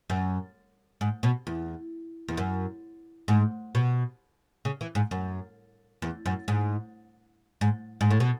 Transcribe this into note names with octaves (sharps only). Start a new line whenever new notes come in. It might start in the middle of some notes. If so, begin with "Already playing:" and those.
F#2
G#2
B2
E2
E2
F#2
G#2
B2
C#3
E3
G#2
F#2
E2
F#2
G#2
G#2
G#2
A2
B2